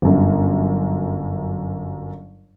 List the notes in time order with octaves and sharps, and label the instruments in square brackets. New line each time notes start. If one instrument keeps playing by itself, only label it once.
[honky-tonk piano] G1 F#2